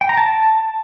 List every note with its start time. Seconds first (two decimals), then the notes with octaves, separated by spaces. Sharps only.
0.01 G5
0.09 A#5
0.17 A5